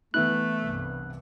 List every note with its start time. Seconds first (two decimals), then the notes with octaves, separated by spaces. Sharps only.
0.14 E3 A3 B3 E4 F#6
0.63 C2 G2